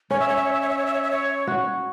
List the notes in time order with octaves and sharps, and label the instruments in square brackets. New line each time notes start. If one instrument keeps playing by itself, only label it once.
[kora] C#4 [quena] C#5
[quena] E5
C#5
E5
C#5
E5
C#5
E5
C#5
E5
C#5
E5
C#5
[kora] F#4